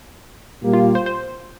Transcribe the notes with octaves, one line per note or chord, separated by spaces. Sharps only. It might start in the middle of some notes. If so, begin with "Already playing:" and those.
A#2 G3 A#3 G4
F4
C5
C5